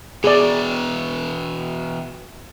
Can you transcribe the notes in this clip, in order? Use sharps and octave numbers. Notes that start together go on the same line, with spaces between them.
B2 E3 G#4 D5